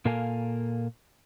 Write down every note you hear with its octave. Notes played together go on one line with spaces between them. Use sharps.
A#2 A#3 A4 A#4 F5 G#5